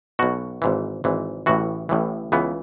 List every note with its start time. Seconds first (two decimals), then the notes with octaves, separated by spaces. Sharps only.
0.19 B1 B2 F#4
0.62 G#1 G#2 E3
1.04 G#1 G#2 E3
1.46 A1 A2 E3 F#4
1.89 A1 A2 E3
2.32 C#2 C#3 E3 B3